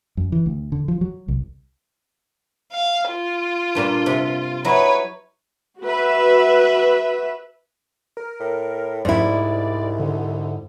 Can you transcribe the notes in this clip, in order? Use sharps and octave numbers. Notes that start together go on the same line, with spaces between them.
F#2
E3
D2
D3
F3
F#3
C2
F5
F4
G2 A#2 D4
C3
F#3 E4 B4 C#5 D#5
F#4 B4 E5
A#4
A2
C2 G#2 E4 D5
D3